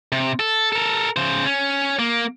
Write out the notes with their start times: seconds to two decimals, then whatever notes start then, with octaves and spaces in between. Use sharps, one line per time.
0.12 C3
0.40 A4
0.73 A4 A#4
1.16 C#3 C5
1.45 C#4
1.99 A#3